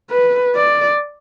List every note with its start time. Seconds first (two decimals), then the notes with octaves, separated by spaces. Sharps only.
0.10 B4
0.55 D5